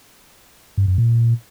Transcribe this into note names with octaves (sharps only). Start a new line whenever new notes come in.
G2
F#2
A#2